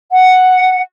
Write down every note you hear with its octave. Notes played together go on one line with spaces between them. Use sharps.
F#5